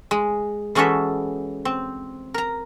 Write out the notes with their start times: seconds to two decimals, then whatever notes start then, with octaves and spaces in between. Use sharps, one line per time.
0.11 G#3
0.75 E3 G#3 C#4 F#4 A4 E5
1.65 C4
2.34 A#4 A#5